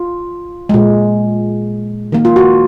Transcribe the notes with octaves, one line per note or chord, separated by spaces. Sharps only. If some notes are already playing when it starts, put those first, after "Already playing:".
Already playing: F4
A#2 G#3
D#3 A#3
F4
F#4